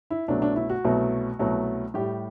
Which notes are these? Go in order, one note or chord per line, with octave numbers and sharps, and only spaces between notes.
E4
C2 B2 F#3 A3 D4
D4
E4
F#4
C2 B2 F#3 A3
C2 B2 F#3 A3
A2 G3 G4